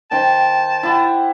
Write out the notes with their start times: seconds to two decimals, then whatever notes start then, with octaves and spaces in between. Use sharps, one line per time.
0.11 D#3 C5 G5 A5
0.83 E4 G4 F#5